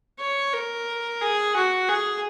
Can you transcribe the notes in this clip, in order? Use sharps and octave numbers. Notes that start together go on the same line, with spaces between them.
C#5
A#4
G#4
F#4
G#4